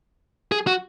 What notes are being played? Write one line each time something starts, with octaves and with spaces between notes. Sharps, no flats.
G#4
F#4